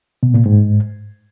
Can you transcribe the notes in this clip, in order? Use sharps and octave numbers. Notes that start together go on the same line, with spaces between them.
B2
A#2
G#2